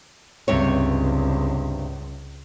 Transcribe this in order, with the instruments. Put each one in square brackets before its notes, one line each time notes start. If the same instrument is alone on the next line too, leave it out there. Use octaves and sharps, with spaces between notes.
[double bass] C#2 [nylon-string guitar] G2 C3 C#5